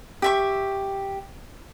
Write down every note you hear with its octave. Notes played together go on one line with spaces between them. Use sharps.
G4 E5 C#6